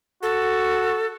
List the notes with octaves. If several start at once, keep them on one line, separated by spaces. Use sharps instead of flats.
F#4 A4